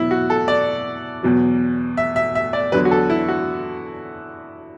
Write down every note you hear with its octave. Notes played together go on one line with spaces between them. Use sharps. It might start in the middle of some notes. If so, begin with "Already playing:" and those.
Already playing: E2 B2 F#3 E4
F#4
A4
D5
E2 B2 F#3
E5
E5
E5
D5
E2 D3 F#3 B4
F#4
A4
E4
F#4